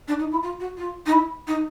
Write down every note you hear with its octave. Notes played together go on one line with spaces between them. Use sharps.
D4
D#4
E4
F4
F#4
F4
D#4
E4
D#4